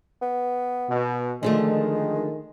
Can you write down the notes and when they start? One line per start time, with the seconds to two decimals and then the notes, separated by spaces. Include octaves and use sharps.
0.22 B3
0.89 B2
1.43 D3 D#3 F3 G#3 A3